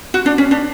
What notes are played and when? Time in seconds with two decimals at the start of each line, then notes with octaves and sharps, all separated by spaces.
0.14 F#4
0.26 D4
0.38 C#4
0.51 D4